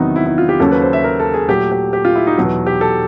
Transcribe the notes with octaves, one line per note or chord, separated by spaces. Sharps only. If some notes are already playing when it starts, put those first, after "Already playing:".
Already playing: E2 C3 D#3 F#3 B3 D#4
E4
E4
F4
G4
D#2 C#3 F#3 A#3 C#4 A4
B4
C5
E5
A#4
A4
G#4
A#2 F#3 A3 G4
G4
G4
F4
E4
D#4
E2 B2 F#3
G4
A4